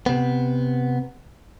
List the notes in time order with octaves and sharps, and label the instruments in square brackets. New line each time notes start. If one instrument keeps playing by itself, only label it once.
[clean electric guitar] C3 B3